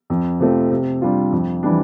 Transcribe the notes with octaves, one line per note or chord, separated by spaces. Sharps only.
F2
C3 F3 A3 C4
C3
G3 D4 F4
F2
E3 G3 D4